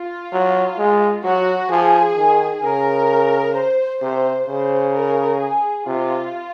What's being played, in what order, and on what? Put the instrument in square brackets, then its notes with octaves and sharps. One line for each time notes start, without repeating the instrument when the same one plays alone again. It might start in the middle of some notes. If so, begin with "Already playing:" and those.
Already playing: [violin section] F4
[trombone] F#3
G#3
[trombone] F#3 [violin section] F#4
[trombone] F3 [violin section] G#4
[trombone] D#3
[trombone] C#3 [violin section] A#4
[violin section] C5
[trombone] C3 [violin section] C5
[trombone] C#3 [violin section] C5
[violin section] A#4
G#4
[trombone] C3 [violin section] F4